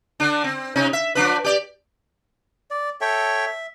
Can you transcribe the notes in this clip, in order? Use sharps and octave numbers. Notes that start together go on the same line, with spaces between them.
D3 D4
C4
C3 C#4 D#4
E5
F3 D4 B4
G4 D5
D5
A4 C#5 E5 G5
E5